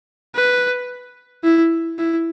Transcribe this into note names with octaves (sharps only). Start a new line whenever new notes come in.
B4
E4
E4